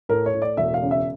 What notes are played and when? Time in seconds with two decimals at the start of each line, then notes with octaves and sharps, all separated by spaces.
0.09 A2 A#4
0.26 C#5
0.34 A2
0.42 D5
0.57 E1 E5
0.74 F5
0.82 C#3
0.91 E5